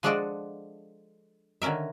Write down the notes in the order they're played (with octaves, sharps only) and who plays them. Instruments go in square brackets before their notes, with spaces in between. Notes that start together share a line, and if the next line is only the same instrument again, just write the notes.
[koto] F3 G#3 D4 F#4 A4 D5
D3 D#3 C#4 A#4 E5